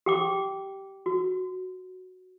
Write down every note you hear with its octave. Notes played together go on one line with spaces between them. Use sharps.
G4 G5 D6
F#4